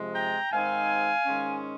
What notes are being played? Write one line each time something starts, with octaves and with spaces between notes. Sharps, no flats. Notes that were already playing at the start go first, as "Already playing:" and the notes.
Already playing: C3 F3 G#3
G5 A#5
G#2 D#3 G#3 C4 D#4 F5 G#5
G#2 D#3 G#3 C#4